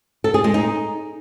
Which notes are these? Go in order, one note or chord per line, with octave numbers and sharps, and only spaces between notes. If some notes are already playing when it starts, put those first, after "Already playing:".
A4
G#4
G#3
D#4